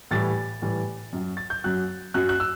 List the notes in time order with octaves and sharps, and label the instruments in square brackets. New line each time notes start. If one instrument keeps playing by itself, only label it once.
[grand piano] A2 E3 G3 A6
A2 E3 G3
F#2 F#3
A6
G6
F#2 F#3 F#6
F#2 F#3 F#6
F#6
E6